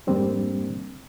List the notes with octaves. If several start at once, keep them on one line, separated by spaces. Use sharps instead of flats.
F2 G#2 G3 A#3 C4 D4